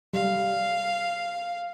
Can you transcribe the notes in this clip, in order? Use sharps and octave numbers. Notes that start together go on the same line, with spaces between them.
G3 F5